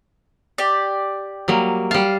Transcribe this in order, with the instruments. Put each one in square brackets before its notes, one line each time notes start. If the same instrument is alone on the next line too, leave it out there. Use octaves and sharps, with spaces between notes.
[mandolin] G4 D5
[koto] F#3 G3 A#3
[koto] G3 A5 [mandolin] F5